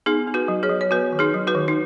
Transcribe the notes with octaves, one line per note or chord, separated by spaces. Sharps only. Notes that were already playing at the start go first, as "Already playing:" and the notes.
B3 D#4 G#4
B3
F#4 B4
F#3
G#4 C#5
F#3
C#5
B3 F#4 B4
D#3
D#4 G#4
F#3
F#4 B4
D#3
D#4